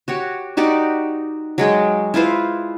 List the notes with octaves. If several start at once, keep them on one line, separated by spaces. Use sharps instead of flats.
F#4 G4 C#5
D#4 F#4 G4 D5
F#3 G#3 G#4 G5
E4 F4 B4 C5